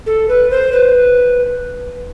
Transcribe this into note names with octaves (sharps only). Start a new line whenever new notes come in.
A4
B4
C5
B4